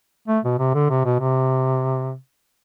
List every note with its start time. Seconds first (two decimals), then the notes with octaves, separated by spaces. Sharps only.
0.28 A3
0.45 B2
0.59 C3
0.74 D3
0.90 C3
1.05 B2
1.20 C3